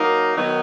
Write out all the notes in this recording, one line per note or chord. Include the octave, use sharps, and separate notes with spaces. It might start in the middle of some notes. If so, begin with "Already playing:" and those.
Already playing: F#3 A#3 D#4 A#4
D#3 F#3 B3 D#4